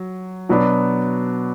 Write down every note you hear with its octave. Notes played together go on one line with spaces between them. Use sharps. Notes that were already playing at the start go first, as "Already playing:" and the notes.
Already playing: F#3
B2 F#3 B3 D4